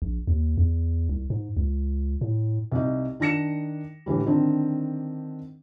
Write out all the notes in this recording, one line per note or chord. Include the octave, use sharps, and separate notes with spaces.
A#1
D#2
E2
C2
G#2
C#2
A2
C2 D#4
D#3 D4 A#6 C#7 E7
A2 D3 E3 G3
D3 D#3 C4 D4